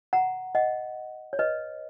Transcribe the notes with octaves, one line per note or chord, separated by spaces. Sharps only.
F#5 A#5
D#5 F#5
C#5
B4 D#5